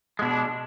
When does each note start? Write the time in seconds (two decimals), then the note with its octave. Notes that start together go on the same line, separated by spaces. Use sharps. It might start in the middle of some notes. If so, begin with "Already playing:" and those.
0.19 G#3
0.22 B2
0.25 D4